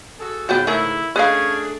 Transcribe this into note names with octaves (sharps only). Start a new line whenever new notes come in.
F#4 G#4 A4
G#2 C#3 B3 F#4 G5
A3 E4 G#4 A#4
A3 C#4 D4 G#4 B4 D#5 F5